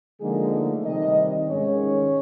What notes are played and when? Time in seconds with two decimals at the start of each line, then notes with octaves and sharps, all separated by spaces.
0.21 D3 F3 G#3 A#3 D#4 G#4
0.52 A3 A4
0.84 C3 D#3 G3 D#4 D#5
1.49 G#2 D#3 G#3 C#4 C#5